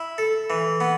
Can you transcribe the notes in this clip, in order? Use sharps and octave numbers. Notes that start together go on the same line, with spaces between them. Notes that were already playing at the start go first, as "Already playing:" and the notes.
Already playing: E4
A4
E3
B3